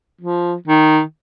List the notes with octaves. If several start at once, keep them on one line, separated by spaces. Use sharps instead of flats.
F3
D#3